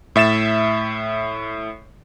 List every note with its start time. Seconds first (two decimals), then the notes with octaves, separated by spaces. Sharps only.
0.16 A2 E5 A6 E7